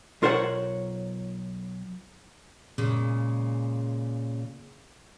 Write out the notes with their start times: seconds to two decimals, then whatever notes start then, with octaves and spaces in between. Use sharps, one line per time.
0.22 B1 F4 A#4 C5 C#5 F#5
2.78 A#2 C#3 G#3